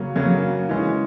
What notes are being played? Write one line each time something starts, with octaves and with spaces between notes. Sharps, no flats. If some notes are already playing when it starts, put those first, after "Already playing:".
Already playing: C#3 F#3 A#3 C#4
C#3 F#3 A#3 C#4
E3 G#3 C#4